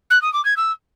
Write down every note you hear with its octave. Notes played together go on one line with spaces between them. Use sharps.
F#6
D#6
D6
G#6
E6